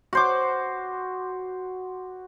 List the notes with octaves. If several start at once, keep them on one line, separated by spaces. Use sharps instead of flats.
F#4 C5 D6